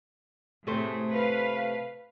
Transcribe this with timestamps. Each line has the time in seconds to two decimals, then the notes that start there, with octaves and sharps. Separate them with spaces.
0.67 A2 C3 A3 G#4 C5
1.11 B4 F5